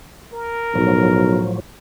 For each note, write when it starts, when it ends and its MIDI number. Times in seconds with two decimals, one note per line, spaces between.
0.33 1.55 70
0.75 1.44 35
0.75 1.60 45
0.75 1.60 53
0.75 1.60 54